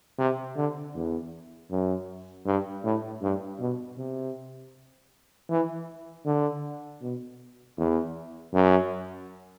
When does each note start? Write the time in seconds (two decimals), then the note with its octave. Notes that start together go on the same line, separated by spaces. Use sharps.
0.18 C3
0.56 D3
0.94 E2
1.71 F#2
2.46 G2
2.83 A2
3.22 G2
3.59 B2
3.97 C3
5.49 E3
6.25 D3
7.01 B2
7.77 E2
8.53 F#2